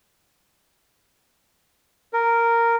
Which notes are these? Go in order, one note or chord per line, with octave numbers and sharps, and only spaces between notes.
A#4